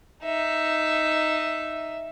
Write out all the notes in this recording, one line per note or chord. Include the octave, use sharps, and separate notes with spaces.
D#4 E5